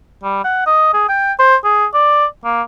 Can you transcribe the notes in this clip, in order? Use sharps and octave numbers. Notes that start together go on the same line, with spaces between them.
G3
F#5
D#5
G#4
G5
C5
G#4
D5
A#3